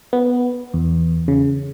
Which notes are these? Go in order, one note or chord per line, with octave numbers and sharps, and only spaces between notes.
B3
E2
C#3